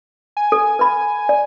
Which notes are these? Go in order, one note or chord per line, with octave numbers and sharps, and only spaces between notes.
G#5
A4
B4 B5
D5